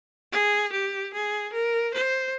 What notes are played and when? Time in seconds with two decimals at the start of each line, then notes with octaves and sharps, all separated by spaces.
0.32 G#4
0.72 G4
1.13 G#4
1.52 A#4
1.94 C5